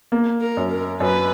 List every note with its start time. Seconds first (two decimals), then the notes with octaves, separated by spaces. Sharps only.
0.12 A#3
0.41 A#4
0.57 F#2
0.71 A#4
1.00 F#2 B4